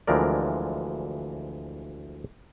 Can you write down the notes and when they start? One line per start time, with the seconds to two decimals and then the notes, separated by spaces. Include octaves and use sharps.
0.07 D2 E3 F3 G#3 A#4 D5